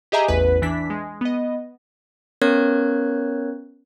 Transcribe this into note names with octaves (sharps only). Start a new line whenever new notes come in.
G4 G#4 D#5 E5 G#5 A#5
A1 E2 B4 B6
E3 D4 B6
G#3
B3 D#5
B3 C#4 A#4 C#5 F#6 G#6